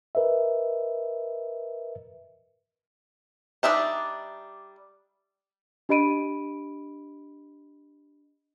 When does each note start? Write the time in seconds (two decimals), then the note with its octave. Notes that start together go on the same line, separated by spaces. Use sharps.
0.15 A#4 B4 D#5 E5
3.63 G3 D4 D#4 E5 A5
5.89 D4 G4 D#5 B5 D7 D#7